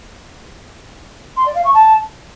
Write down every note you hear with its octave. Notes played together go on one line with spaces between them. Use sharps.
C6
D5
F5
C#6
A5